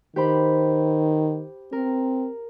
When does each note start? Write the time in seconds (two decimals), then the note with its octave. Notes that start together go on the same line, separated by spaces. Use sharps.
0.16 D#3 G4 C5 B5
1.73 C4 A#4